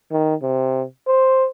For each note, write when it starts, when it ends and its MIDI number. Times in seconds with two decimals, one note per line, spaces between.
0.12 0.35 51
0.42 0.83 48
1.07 1.47 72